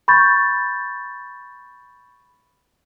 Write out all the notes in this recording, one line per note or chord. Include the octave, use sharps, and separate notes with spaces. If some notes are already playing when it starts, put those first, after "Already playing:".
B5 C#6 G6 A6